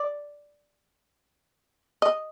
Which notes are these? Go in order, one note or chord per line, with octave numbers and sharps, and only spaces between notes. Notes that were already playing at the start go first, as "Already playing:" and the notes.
Already playing: D5
D#5